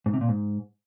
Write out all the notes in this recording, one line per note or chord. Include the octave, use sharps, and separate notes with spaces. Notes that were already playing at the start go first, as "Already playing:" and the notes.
G#2
C3
A#2
G#2